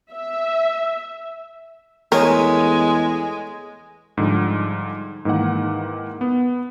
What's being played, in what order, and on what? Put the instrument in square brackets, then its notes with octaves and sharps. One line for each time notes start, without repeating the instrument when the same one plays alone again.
[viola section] E5
[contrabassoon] E2 [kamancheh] G#3 [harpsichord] A3 A4 C#5 [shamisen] A#4
[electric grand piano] G#2 D3 F3 G3
G#2 D#3 E3 A#3 F#5
B3